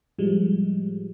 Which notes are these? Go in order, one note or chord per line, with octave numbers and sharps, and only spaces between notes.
A2 F3 G3 G#3